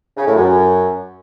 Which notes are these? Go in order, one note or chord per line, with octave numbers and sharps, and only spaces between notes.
C#3
A2
F#2